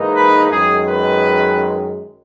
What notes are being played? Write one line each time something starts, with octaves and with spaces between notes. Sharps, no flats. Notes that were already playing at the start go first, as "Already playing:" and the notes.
Already playing: G#2 E3 A#3 D#4
B4
F#2 D#3 G#3 G#4
B4